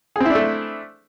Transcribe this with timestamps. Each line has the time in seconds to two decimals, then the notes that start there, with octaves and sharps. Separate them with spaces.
0.16 G#4
0.20 C4
0.25 E4
0.30 D4
0.35 A3